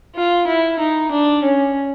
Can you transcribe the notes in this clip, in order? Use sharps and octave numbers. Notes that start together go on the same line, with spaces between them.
F4
E4
D#4
D4
C#4